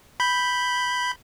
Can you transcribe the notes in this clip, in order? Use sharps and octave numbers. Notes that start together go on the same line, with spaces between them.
B5 G6